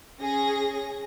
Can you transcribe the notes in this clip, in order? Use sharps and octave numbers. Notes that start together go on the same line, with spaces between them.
C#4 G#4 A#6